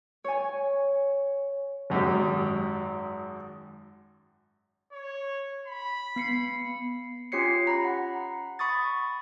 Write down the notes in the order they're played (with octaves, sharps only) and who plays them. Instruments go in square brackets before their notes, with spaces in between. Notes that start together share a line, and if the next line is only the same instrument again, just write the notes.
[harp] C#5 G#5
[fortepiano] G#1 F#2 G#3 G4
[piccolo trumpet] C#5
B5
[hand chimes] B3 C7 C#7
[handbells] C#4 F4 G4 C#5 C7 C#7
A#5 B5
F#5
B5 C#6 D#6 A6